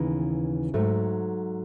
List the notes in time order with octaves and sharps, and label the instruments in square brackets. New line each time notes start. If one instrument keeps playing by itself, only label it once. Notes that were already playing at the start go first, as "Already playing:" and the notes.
Already playing: [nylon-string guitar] D#2 C#3 E3 B3 D#4
G#2 F#3 A3